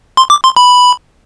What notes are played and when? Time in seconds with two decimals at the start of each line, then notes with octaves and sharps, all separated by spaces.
0.17 C6
0.30 D6
0.44 C6
0.56 B5